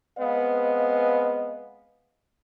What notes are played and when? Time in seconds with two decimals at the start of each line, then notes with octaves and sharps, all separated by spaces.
0.19 G#3 B3 C4 B4 D#5 F5